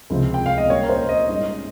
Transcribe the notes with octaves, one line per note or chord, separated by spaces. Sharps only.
C#2 C3 F3 C4
G5
F5
D#5
A#2 G3 A#3 C#4 C#5
A#4
C5
D#5
G#2 G3 C#4 D#5